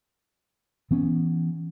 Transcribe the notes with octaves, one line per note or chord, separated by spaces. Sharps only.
E3 B3 C#4